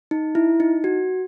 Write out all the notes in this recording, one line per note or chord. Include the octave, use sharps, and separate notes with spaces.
D#4
E4
D#4
F#4